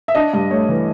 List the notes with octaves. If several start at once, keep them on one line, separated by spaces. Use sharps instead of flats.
E5
D4 D#5
G2
A3 C#5
E3